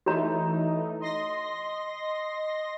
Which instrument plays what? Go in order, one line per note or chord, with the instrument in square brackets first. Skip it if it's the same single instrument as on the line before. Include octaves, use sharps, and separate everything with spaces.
[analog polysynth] E3 A3 D#4 [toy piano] F#4 C#5 A#5
[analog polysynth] D#5 C6 A#6